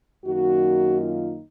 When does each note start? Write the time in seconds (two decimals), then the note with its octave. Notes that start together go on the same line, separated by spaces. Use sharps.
0.24 F#2 D#3 A#3 D#4 F#4
0.98 F4